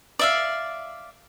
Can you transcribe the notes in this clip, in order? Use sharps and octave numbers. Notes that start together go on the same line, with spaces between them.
D5 E5 F5